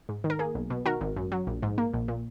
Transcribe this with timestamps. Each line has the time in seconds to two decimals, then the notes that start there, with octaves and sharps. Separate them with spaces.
0.09 G#2
0.24 D#3
0.30 A#4
0.39 A#3 G#4
0.55 B1
0.70 B2
0.86 D#3 F#4 A#4
1.01 G#1
1.16 F#2
1.32 F#3
1.47 A#1
1.63 G#2
1.78 A#3
1.94 A#1
2.08 A#2